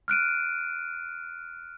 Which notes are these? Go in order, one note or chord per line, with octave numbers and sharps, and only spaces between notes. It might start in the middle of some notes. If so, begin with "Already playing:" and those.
F6 F#6 D7 D#7